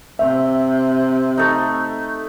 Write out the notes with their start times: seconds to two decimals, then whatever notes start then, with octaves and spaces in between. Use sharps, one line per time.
0.19 C3 E5
1.37 A3 D#4